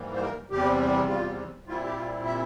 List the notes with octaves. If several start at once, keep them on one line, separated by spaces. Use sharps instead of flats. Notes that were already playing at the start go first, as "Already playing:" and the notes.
Already playing: G#2 E3 G3 A#3
C5
A#4
E2 C3 G3 G4
F4
A#2 G3 C4 E4 F4
G4
F4
E5